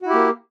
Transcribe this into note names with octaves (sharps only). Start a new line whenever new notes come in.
A#3 E4 F#4 G4